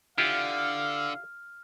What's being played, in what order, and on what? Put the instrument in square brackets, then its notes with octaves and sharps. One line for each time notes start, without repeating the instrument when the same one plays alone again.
[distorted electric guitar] D3 [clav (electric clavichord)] E4 F4 G4 [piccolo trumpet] F5 [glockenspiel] F6